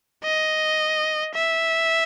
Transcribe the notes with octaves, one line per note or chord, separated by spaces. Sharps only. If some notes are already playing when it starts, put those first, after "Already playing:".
D#5
E5